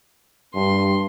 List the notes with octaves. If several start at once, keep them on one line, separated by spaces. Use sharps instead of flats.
G2 C6